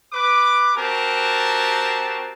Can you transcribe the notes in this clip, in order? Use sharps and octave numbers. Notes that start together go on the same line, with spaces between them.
B4 D6
C4 F#4 G4 A#4 A5